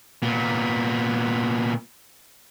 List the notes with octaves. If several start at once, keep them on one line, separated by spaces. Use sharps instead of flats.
A#2 B3